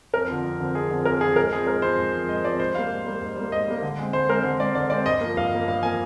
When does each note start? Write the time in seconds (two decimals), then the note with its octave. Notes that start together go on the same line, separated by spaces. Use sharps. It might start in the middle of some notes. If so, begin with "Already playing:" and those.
0.13 F2 A#4
0.29 D3 F3 C4
0.44 F2
0.60 D3 F3 C4
0.75 F2 G#4
0.91 D3 F3 C4
1.05 F2 A#4
1.21 D3 F3 C4 G#4
1.36 G#2 A#4
1.52 F3 C4 G#4
1.67 G#2 A#4
1.82 F3 C4 C5
1.99 G#2
2.13 F3 C4
2.29 G#2 D#5
2.44 F3 C4 D5
2.59 G#2 C5
2.75 G3 A#3 F5
2.90 G#2
3.06 G3 A#3
3.22 G#2
3.36 G3 A#3
3.52 G#2 D#5
3.68 G3 A#3
3.82 D3
3.99 G#3 C4
4.13 D3 C5
4.29 G#3 C4 A#4
4.44 D3 C5
4.59 G#3 C4 D5
4.75 D3 D5
4.90 G#3 C4 D5
5.06 G2 D#5
5.21 F3 A#3
5.37 G2 F5
5.51 F3 A#3
5.68 G2 F5
5.83 F3 A#3 G#5